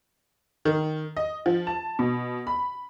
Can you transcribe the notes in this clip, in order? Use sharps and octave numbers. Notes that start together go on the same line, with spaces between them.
D#3
D#5
F3
A5
B2
B5